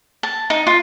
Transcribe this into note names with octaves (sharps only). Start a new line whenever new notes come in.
A5
D#4
F4